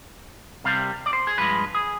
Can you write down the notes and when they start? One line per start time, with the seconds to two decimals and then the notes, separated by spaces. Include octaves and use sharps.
0.64 C2 C3 G3 F5
1.06 D5
1.13 C5
1.27 G#4
1.38 G2 F3 G#3 B4
1.75 G#4